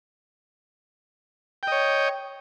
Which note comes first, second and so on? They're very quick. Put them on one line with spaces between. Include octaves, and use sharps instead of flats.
G5 D#5 C#5